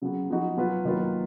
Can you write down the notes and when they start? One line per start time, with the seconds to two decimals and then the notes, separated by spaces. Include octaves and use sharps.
0.02 C#3 F#3 B3
0.30 F3 B3 D#4 F#4
0.57 F#3 B3 F4 B4
0.85 D#3 F#3 A#3 F4 B4